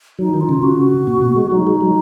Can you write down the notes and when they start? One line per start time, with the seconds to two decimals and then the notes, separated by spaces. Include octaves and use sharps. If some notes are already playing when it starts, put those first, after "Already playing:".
0.19 F#3 D#4
0.34 D#3
0.41 F4
0.49 C#3
0.63 C#3 F#4
1.07 A#2
1.22 B2
1.36 G#3
1.51 F#3 D#4
1.67 G#3
1.81 F#3